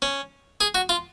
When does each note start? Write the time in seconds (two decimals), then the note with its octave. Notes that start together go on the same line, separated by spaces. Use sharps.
0.02 C#4
0.61 G#4
0.75 F#4
0.89 F4